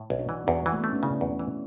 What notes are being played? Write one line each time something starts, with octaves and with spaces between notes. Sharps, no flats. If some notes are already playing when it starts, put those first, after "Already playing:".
Already playing: A2
B1
D4 F#4
E3
E2 D4 F#4
E3
A3
B3
A3 C#4
D4
C#3 C#4 E4
E2
E3